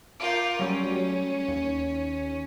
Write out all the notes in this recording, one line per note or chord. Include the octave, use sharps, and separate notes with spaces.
F4 A#4 D6 G6
F#3 G3 A3 C#4
D#2